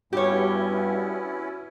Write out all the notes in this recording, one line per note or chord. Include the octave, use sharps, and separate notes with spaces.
G2 B3 C#4 E4 F#4 G4 C#5